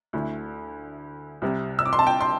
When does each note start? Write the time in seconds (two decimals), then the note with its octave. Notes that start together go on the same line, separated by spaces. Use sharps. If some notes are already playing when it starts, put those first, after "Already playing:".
0.13 D2 D3 A3 E4
1.42 C2 C3 G3
1.79 E6
1.86 D6
1.93 C6
1.99 A5
2.07 G5
2.21 C6